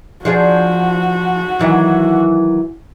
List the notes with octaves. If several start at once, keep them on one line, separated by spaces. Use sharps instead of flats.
F3 D4 F#4 G#4
D#3 E3 F#3